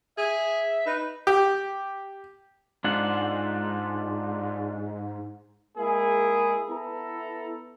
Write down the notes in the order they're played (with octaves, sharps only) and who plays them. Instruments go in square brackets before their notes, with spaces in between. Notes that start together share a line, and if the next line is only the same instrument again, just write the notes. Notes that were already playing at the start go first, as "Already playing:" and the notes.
[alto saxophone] G#4 [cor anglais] E5
[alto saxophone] D#4 [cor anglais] B4
[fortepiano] G4
[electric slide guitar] G#2 [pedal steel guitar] D4 F4 F#5
[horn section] G#3 A#3 E4 G#4
B3 E4 A4 A#5